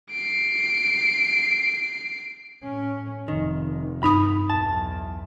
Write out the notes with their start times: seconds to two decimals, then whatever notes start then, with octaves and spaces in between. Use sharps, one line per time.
0.11 C7 D7
2.63 A2 C#4
3.28 F1 D#3
4.03 G2 D#4 B5 D#6
4.50 B1 E2 A5